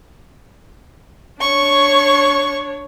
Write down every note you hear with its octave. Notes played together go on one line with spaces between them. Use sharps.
D4 C#5 C#6